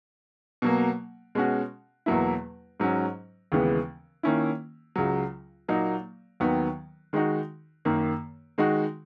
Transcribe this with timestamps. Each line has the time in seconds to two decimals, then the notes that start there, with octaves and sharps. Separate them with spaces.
0.62 B2 F#3 A#3
1.35 B2 G#3 C#4 F#4
2.06 E2 B2 F#3 A#3 E4
2.80 G#2 F#3 C#4
3.52 D#2 C#3 E3 G#3 B3
4.23 D#3 A#3 C#4 E4
4.96 C#2 C#3 F#3
5.68 A#2 F#3 A#3 D#4
6.40 D#2 D#3 F#3 B3
7.13 D#3 G#3 D#4 F#4
7.85 F#2 D#3 A#3
8.58 D#3 G#3 D#4 F#4